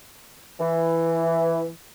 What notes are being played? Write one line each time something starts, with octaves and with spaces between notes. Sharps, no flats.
E3